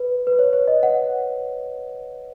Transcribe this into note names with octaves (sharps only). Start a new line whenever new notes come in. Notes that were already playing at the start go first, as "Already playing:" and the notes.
Already playing: B4
B4
C#5
C#5
D#5
F#5